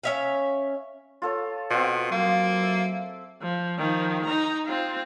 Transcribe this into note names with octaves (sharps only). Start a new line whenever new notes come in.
C#4 E5 F5
F4 A4 C#5
B2 C4 F4
F#3 A#3
E5
F3
D#3 F3
D#4 A#5
C4 F4